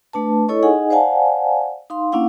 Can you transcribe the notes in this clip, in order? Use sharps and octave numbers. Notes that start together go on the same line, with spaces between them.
A3 D4 B4 A5
E4 A4 C#5 D#5 C#6
D#4 G#4 D#5 F#5 G#5
C5 D5 F5 F#5 G#5 A5
D#4 F5 C6
A#3 C#4 D4 E4 F5 F#5